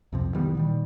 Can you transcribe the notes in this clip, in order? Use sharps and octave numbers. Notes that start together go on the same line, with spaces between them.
C2 F2 C3
D#3 E3 G3 B3
A#2 D#3 G3